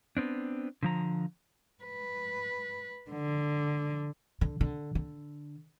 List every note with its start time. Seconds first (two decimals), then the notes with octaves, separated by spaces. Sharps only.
0.17 B3 C4 D4
0.83 D3 F3 A#5
1.84 B4
3.11 D3
4.41 D3
4.61 D3
4.95 D3